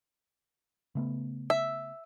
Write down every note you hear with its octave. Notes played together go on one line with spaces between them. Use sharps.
C#3 A3 B3
E5